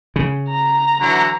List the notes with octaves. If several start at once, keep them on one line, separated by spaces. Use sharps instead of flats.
C#3
A#5
D3 E3 F#3